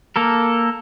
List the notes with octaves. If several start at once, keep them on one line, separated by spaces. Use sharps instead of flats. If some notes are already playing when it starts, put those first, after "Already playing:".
A#3 A4 A#4